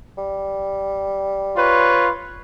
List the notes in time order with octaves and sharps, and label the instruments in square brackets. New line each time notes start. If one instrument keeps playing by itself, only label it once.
[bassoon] G3
[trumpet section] F4 B4 C#5